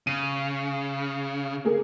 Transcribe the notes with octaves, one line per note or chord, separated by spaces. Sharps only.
C#3 D#7
A#3 G#4